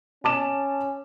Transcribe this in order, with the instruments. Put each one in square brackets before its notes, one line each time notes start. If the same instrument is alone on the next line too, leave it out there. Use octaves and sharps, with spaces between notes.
[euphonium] C#4 [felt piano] A5 D6 E7